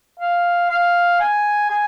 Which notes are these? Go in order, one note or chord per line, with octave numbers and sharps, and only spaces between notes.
F5
F5
G#5
G#5